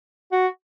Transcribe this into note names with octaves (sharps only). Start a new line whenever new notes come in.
F#4